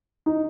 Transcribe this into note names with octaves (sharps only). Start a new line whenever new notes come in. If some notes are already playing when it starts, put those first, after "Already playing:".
D#4